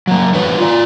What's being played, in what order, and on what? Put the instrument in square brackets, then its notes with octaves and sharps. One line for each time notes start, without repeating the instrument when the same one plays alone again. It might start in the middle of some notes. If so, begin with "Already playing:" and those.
[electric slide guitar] F#3 A#3
E3 G3 D4 F#4 B4 C#5
F4 D5